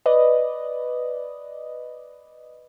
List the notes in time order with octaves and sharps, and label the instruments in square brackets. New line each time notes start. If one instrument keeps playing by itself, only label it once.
[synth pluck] B4 D5 D#5